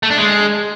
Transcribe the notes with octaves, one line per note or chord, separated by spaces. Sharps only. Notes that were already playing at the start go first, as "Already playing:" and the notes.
A3
D4
G#3